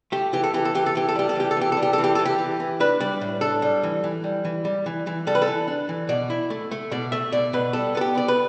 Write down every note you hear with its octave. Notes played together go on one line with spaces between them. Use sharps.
A3 G4
E3 G4
A4
E3 G4
A4
E3 G4
A4
E3 G4
A4
G3 G4
A4
E3 G4
A4
E3 G4
G3 A4
G4
A4
E3
G4
E3 A4
G4
E3
E3
D4 B4
G3 D5
A2
D4 A4
G3
E3
E3
G3
E3
G3
E3
E3
G3 A4
B4
A4
E3
D4
E3
B2 D5
E4
A3
A3
B2 D5
A3 E5
B2 D5
B2 B4
G3 A4
B3 A4
G4
B3 D5
B4